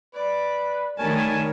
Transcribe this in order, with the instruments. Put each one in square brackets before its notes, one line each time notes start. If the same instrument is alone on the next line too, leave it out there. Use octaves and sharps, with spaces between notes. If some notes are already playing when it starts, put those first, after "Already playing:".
[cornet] B4 [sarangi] D5
[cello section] D#3 A3 [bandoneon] G3 A#4 C#5 [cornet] G#5 [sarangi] A5